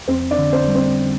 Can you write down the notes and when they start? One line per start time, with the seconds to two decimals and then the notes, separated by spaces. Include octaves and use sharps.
0.08 F2 C4 C5
0.31 D4 D5
0.38 D3
0.52 C4 C5
0.68 G3
0.75 C4 C5